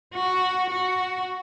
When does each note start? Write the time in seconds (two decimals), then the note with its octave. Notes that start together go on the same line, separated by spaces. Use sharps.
0.14 F#4
0.70 F#4